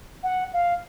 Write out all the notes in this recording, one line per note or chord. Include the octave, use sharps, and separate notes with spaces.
F#5
F5